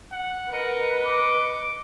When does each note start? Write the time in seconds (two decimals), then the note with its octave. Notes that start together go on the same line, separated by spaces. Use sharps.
0.12 F#5
0.52 A#4 B4 D#5 C#7
1.06 D6